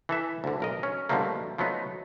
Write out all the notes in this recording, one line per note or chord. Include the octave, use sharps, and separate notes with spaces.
E3 A4 E5
D2 D3
B1 A#4 D#5
C#4
B2 D3 F3 G3 A3 A#3
F3 F#3 A3 B3 D#4